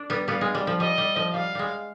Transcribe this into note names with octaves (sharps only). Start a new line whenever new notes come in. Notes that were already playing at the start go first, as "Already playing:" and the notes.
Already playing: D4
G3 B3
G3 B3 F5
G#3
G3
F3
G3 D#5
G3
F3
G3 F5
G3 G#3